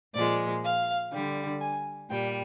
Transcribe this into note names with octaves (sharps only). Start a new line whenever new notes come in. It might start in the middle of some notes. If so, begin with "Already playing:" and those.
A#2 F3 G#3 D5
F5
D3 G3
G#5
A#2 G3 G5